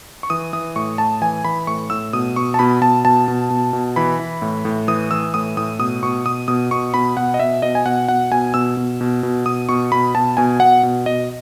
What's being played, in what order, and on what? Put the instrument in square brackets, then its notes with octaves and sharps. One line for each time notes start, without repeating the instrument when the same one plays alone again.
[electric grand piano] C#6
E3 D#6
E3 D#6
A2 C#6
A2 A5
E3 G#5
E3 B5
A2 C#6
A2 E6
B2 D#6
B2 C#6
A5
B2 B5
B2 A5
B2 A5
B2
B2
B2
E3 B5
E3
A2
A2
E3 D#6
E3 E6
A2 D#6
A2 D#6
B2 D#6
B2 C#6
B2 D#6
B2 D#6
B2 C#6
B2 B5
B2 F#5
D#5
B2 E5
B2 D#5
G#5
B2 F#5
B2 F#5
B2 G#5
B2 E6
B2
B2
B2
B2 D#6
B2 C#6
B2 B5
B2 A5
B2 G#5
B2 F#5
B2
B2 D#5